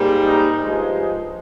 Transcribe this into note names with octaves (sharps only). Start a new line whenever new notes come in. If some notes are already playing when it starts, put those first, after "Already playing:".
Already playing: G#2 G3 A#3
D#4
G2 F3 G#3